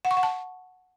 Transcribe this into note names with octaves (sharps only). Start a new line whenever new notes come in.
F#5
C#6
F#5
A5